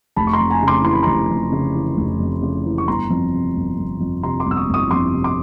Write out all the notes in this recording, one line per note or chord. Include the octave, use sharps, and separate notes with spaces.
F1 A5 B5
C#6
A#5 C6
F2
G#5 A#5
C#3
C6 D6
E3 C6
B5
F1 A#5 C6
F2
C#3
E3
F1
F2
C#3
E3
C#6
G1 A#5 C6
F2
C3
G1
G1
F2
C3 A#5 C6
C6 D6
G1
E6
C#6 D#6
G1
C#6 D#6
F2 C6 D6
C3
C6 D6